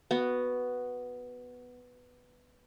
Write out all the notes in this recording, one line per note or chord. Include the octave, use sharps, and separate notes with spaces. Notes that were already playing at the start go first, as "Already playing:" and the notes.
B3 F#4